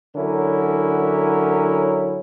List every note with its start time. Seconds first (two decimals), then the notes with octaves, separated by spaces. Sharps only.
0.16 D3 F#3 C#4 E4 A#4